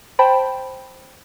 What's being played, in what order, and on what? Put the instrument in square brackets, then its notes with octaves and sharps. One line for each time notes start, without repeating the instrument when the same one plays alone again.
[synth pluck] C5 G5 A5 B5